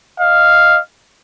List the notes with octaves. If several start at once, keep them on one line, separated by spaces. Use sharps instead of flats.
D#5 F5